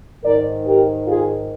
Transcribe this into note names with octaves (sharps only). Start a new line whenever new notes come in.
G#2 D#3 A#4 D5
G4 A#4
F4 G#4